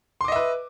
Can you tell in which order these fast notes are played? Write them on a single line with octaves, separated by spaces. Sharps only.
C6 D6 D#5 E5 B4